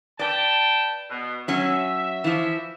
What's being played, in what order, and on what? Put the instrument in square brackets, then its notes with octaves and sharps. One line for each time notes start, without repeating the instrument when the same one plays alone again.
[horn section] B4 G5 A5 [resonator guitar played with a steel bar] D5
[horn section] B2 B3
[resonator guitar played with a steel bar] F#3 C#4 [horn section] E5
[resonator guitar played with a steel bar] E3 F3